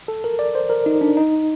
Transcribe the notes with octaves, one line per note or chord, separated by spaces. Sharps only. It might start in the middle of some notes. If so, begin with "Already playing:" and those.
A4
A#4
D5
C5
A#4
D#4
D4
D#4